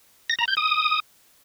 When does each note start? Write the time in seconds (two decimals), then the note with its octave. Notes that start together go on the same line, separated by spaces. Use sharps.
0.30 A#6
0.39 A#5
0.48 G6
0.57 D#6